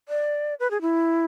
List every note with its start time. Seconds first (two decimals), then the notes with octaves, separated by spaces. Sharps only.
0.09 D5
0.60 B4
0.71 G#4
0.81 E4